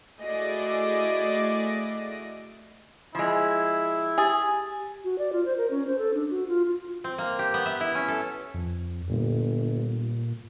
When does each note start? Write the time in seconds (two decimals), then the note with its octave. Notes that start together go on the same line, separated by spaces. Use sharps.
0.19 A3 E4 F#4 G#4 D5 D#5
3.15 F3 G#3 E4
4.18 G4 G#4 G#5 A6
5.04 F#4
5.18 D5
5.33 F4
5.45 C5
5.57 A#4
5.71 C#4
5.87 C5
5.99 A4
6.14 D4
6.30 F#4
6.48 F4
6.65 F4
7.04 C4
7.18 A#3
7.39 G4
7.54 B3
7.66 E5
7.81 E4
7.95 C#4
8.08 A4
8.54 F2
9.09 G1 A#2